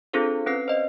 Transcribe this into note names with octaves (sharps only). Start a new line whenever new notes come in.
C4 D4 F4 G#4 A4 C5
C4 C#4 B4 F#6 C7
C5 D5 D#5